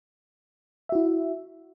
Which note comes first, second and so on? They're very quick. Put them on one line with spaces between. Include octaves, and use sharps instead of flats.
E5 F#4 E4